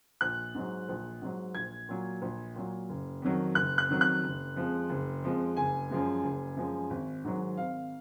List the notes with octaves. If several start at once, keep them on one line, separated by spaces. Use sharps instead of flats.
A#1 F#6
G#2 F#3
A#1
G#2 F#3
A#1 G#6
A#2 F#3
A#1
A#2 F#3
F#1
F2 D#3 F#3
F#1 F#6
F#6
F2 D#3 F#3
F#6
F#1
F2 F3 G#3
F#1
F2 F3 G#3
F#1 G#5
F#2 F3 G#3
F#1
F#2 F3 G#3
G#1
G#2 D#3 F#3
G#1 F5